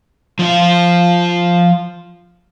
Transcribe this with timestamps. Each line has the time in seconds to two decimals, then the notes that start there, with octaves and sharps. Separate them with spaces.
0.39 F3 F4